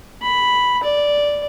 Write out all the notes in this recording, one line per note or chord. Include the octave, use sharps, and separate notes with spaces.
B5
D5